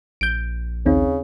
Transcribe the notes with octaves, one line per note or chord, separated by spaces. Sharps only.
A#1 G6 D7
D#2 C#3 C4 D#4